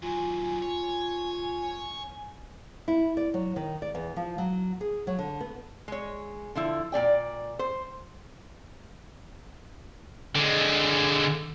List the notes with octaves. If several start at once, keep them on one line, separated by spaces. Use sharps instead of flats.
D#2 F#3 F4 G#5
C#5 G#5
E4
D5
F#3
D#3
D5
E2
F3
F#3
G#4
F#3
D3
B3
G#3 C#5
D3 F3 E4
A#2 C4 D5 G5
C5
D3 G#3